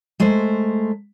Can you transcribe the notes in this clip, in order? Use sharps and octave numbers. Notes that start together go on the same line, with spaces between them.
G#3 A3 A#4 C5